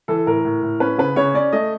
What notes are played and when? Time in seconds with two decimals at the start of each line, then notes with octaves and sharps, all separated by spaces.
0.08 E3 A4
0.27 A2 A#4
0.45 A2
0.63 A2
0.80 C#4 B4
0.98 C#3 B4
1.16 C#3 C#5
1.34 C#4 D5
1.53 A3 D#5